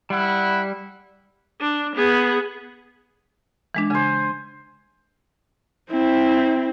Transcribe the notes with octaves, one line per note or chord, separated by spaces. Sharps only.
G3 E4 F#5
D4
B3 G#4
E3 G#3 D4
C#3 C5 G#5
C4 E4